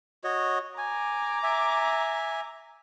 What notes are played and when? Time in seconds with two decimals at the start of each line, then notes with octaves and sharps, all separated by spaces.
0.24 F#4 C#5 D#5
0.78 G#5 A#5 D6
1.43 E5 G#5